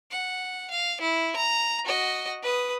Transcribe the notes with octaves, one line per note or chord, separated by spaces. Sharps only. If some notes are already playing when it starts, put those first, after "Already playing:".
F#5
F5
E4
A#5
F#4 D#5
B4 D#6